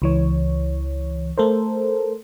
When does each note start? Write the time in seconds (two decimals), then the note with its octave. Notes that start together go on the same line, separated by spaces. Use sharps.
0.02 C#2 E3 C#5
1.38 A3 A4 A#4 C5